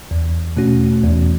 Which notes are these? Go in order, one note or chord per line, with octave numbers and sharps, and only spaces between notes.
E2
B2 A3 C#4 F#4
E2